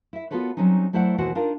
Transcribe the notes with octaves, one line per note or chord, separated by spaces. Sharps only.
E4 E5
B3 F4 F#4 A4 B4 C#5
F#3 G3 C4 C#4 D#4
F#3 A3 E4 C5 D5 F#5
D#2 B2 E3 F#4 C5 F#5
D4 D#4 F4 A#4